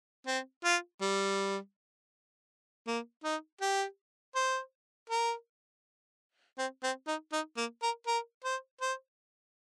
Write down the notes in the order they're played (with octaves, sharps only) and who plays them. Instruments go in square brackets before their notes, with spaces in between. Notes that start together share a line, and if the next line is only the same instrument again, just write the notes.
[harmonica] C4
F4
G3
A#3
D#4
G4
C5
A#4
C4
C4
D#4
D#4
A#3
A#4
A#4
C5
C5